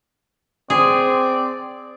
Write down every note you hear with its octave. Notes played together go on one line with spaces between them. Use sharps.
C4 G#4 D5